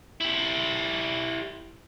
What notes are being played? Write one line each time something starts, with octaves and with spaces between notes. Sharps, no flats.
E4 G4